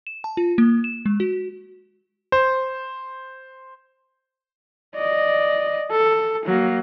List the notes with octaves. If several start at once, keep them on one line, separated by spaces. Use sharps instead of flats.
E7
A5
F4
A#3
E7
G#3
F#4
C5
D5 D#5
A4
F#3 A#3